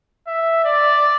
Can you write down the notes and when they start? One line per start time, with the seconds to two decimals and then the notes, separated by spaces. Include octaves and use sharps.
0.27 E5
0.64 D5